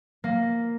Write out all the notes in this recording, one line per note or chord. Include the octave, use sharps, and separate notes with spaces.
A#3